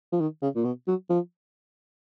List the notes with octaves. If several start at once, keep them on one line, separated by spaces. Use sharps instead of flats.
F3
D#3
C#3
A#2
B2
F#3
F3